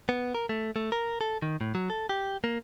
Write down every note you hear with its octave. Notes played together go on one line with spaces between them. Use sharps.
B3
A#4
A3
A3
A#4
A4
D#3
A2
F#3
A4
G4
A#3